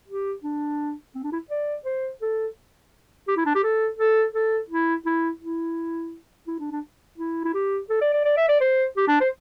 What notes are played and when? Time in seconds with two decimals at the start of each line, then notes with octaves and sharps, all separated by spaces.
0.08 G4
0.44 D4
1.15 C4
1.24 D4
1.32 E4
1.50 D5
1.85 C5
2.22 A4
3.28 G4
3.37 E4
3.46 D4
3.55 G4
3.63 A4
3.99 A4
4.34 A4
4.70 E4
5.05 E4
5.41 E4
6.48 E4
6.60 D4
6.71 D4
7.18 E4
7.44 E4
7.54 G4
7.90 A4
8.01 D5
8.13 D5
8.25 D5
8.37 E5
8.49 D5
8.61 C5
8.97 G4
9.08 D4
9.20 C5